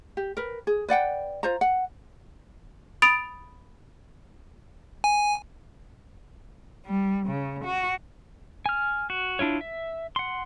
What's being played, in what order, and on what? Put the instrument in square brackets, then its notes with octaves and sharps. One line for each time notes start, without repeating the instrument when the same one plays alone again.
[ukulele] G4
A#4 B4
G#4
B4 D5 F#5 G5
F4 C5 A#5
F#5
[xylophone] B5 D#6 A6 D7 F7
[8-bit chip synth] G#5
[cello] G3
C#3
F#4
[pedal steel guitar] G#5 F6
F#4
D4 E4 F4 C#5
E5
F#5 C6